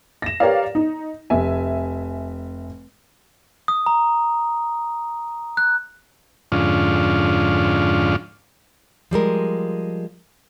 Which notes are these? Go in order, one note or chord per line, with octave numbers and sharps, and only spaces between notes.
A#6 E7
G4 A#4 B4 C#5 D5 F5
D#4
F1 E5 G#5
D#6
A#5
F#6
F2 G#2 D3 C#4 D4 F4
F3 G3 G#3 A#4